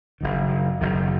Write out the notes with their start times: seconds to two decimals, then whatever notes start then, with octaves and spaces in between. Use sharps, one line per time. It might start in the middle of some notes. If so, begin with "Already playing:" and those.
0.21 F#1 F#2 D#3
0.81 F#1 F#2 D#3